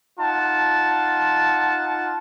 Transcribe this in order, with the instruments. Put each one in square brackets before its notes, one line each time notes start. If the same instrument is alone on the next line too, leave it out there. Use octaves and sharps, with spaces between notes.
[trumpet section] D#4 F4 F#5 A5